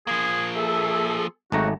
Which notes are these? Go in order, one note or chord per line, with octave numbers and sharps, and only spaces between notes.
F3 A#3 G#4
G#4 A4 E5
G#1 C#3 F#3 A3 D#4 F#4 A#5